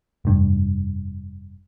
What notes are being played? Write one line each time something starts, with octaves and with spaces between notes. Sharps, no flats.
F1 G2